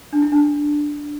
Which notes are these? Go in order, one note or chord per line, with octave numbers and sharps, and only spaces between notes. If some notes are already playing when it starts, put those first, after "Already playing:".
D4
E4
D4